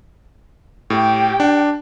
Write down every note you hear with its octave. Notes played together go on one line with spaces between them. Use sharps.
A2 G4 G5
D4